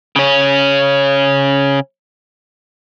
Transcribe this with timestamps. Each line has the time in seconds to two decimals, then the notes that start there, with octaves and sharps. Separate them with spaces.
0.16 C#3 C#4